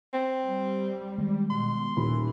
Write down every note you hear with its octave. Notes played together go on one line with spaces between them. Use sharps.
C4
G3
D#3 G#3
B2 C6
D#1 D#2 A2 E3 B5